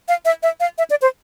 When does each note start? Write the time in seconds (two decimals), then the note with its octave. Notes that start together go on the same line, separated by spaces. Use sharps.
0.08 F5
0.25 E5
0.43 E5
0.60 F5
0.78 E5
0.90 D5
1.02 C5